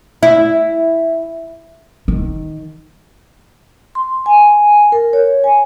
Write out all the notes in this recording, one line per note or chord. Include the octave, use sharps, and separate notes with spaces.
E4
D#3
C6
G#5
A#4
C#5
G#5